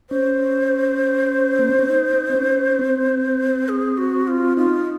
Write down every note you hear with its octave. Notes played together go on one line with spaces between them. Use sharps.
C#4 C5
A#3
C4
C#4
D#4
C4
C#4
C4
G#4
F#4
F4
D#4 F4